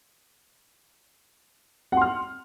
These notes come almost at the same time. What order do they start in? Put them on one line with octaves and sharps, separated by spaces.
F#5 C6 F6